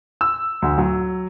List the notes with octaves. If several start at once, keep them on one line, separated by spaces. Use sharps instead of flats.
E6
D2
F#3